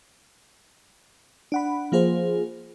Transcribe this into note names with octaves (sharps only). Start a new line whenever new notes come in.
D4 F#5 B5
F3 A#3 F4 G#4 C5